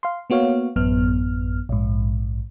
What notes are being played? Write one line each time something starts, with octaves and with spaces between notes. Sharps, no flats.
F5 C6
A#3 B3 F#4 C#5 F5
A1 F#2 B3 F6
A#1 G#2